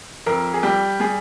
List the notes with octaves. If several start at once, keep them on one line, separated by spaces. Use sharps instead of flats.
F2 A#4
G#4
G3 G4
G3 G#4